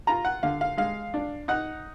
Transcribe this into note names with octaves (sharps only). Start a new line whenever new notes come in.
F4 A#5
F#5
D3 F5
F5
G#3 F5
D4
D#4 F#5